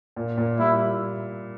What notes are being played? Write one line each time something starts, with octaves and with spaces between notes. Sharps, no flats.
A#2
A#2
G3 E4